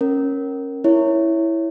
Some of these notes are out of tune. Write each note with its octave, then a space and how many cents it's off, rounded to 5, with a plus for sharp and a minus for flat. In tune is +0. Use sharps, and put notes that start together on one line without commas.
C#4 -15 A#4 +0
E4 +0 C#5 +0